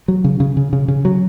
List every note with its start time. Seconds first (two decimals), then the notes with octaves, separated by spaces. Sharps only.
0.08 F#3
0.24 C#3
0.40 C#3
0.57 C#3
0.73 C#3
0.88 C#3
1.05 F#3